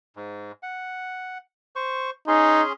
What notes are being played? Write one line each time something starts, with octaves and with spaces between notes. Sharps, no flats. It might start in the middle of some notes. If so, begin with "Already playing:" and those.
G#2
F#5
C5 C#6
C#4 D#4 G#4 C6